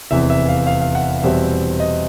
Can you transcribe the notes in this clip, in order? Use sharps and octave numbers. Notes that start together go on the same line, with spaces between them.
F1 E2 C3 E3 E5
E5
F5
F5
F5
F#5
E2 B2 G3 C4 E5
D#5